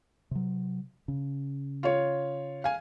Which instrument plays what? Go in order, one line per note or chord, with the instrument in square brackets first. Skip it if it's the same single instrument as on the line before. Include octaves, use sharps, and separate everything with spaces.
[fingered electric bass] C3 F#3
C#3
[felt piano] F4 C#5
F5 G#5